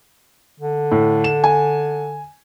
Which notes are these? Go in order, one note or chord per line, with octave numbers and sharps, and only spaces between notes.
D3
A2
E7
G#5